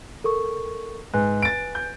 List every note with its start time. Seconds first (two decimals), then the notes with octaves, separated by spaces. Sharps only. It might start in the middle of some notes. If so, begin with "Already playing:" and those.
0.24 A4 A#4 C#6
1.14 G#2 B4 G#5 F#6
1.42 A6 D7
1.75 G6